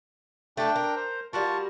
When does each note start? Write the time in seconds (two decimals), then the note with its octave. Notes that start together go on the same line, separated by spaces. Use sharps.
0.57 A3 D4 A4 G5
0.76 A#4
0.96 C5
1.33 G3 F4 F#4 A#4 A5 C#6